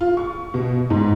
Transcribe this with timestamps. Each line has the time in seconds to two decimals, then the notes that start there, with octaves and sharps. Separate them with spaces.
0.01 F4
0.17 C#6
0.54 B2
0.90 G#2